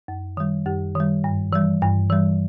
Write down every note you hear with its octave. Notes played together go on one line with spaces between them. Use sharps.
F#2
D#3 G3
F#2 G4
D#3 G3
G2
E3 G3
G2
E3 G3